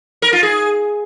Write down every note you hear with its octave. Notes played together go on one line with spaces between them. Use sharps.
A#4
F4
G#4